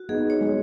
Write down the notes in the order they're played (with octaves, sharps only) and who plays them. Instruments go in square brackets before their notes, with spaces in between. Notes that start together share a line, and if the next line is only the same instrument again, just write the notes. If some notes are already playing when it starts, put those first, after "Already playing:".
Already playing: [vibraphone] F#4
[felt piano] B3 D#4 [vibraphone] G#4
[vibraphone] C#5
[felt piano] G#3